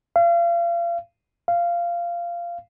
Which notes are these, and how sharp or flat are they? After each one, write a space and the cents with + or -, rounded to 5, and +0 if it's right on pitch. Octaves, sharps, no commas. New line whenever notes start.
F5 -35
F5 -15